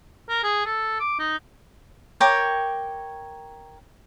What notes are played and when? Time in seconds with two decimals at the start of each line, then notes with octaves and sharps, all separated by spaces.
0.29 A#4
0.43 G#4
0.65 A4
1.00 D6
1.19 D#4
2.20 A#4 C#5 G5 D6